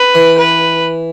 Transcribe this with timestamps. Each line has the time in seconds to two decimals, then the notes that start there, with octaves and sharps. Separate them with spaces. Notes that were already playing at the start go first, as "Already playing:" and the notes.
Already playing: B4
0.15 E3
0.38 B4